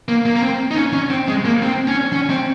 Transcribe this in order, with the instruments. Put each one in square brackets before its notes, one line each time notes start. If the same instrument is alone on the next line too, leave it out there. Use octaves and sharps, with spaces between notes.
[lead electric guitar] A#3
A#3
A#3
C4
D#4
C#4
C#4
C4
G#3
A#3
C4
C#4
C#4
C4